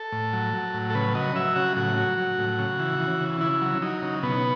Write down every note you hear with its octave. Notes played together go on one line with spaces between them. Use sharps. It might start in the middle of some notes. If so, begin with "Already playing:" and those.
Already playing: A4
A2
F#3
F#3
A2
A4
C#3 B4
F#3 D#5
F#3 E5
C#3 F#4
A2 F#4
F#3
F#3
A2
C#3
E3
E3
C#3
C#3 E4
F#3
F#3 D#4
C#3
B2 B3